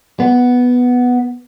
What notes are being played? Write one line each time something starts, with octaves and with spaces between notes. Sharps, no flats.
B3